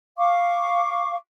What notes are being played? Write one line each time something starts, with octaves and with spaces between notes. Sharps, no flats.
F5 C#6 D6